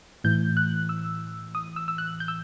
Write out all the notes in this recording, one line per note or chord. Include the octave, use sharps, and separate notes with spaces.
A2 E3 G6
F#6
E6
D#6
E6
E6
F#6
G6
E6